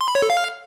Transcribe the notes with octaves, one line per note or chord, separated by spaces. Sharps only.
C6
B5
C#5
A4
F5